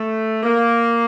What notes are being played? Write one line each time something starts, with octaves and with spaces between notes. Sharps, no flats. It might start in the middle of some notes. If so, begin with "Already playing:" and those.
Already playing: A3
A#3